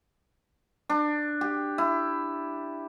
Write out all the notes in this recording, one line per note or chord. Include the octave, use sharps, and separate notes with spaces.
D4
G4
E4